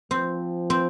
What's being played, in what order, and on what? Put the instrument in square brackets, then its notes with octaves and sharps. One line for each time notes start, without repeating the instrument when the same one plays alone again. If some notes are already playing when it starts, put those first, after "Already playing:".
[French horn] F3 [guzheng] C4
[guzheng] C4